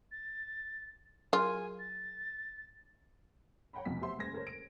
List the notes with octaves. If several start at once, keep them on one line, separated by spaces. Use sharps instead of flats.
A6
F#3 F4 G#4 A#4 G#5
A6
C#5 F#5 G5 A#5 B5
F1 B1 E2 F3 B6
G4 C5 E5 F#5 C6
F#1 C#2 C5 G#6 A#6
A4 A#4 C5 C#5
D7